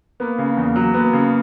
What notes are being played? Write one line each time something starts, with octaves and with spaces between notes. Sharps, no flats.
A#3 B3
C#3
E2
F#3
A#3 B3
C#3